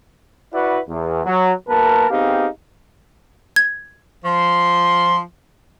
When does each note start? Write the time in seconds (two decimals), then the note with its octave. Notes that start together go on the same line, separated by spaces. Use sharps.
0.53 E4 F#4 B4 D5 F#5
0.89 E2
1.25 F#3
1.68 B1 A#3 A#4 B4 A5
2.10 B3 C4 D#4 G4 G#4 F5
3.56 G#6
4.25 F3 C6